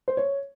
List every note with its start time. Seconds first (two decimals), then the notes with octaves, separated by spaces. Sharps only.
0.08 C5
0.17 C#5